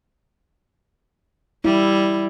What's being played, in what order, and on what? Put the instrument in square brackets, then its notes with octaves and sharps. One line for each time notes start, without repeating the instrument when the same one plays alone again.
[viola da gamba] G3 [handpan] E4